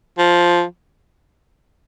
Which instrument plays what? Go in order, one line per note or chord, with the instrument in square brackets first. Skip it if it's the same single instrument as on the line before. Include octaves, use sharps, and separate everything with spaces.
[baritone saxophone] F3